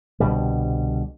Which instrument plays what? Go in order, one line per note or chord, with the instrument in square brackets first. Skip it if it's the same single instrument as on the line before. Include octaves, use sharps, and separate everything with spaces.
[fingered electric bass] C2 B2 D3 G3